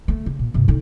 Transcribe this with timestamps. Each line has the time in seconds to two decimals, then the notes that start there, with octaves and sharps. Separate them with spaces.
0.08 D3 A3
0.26 C#3
0.39 A#2
0.54 G2 C3
0.68 D3 D#4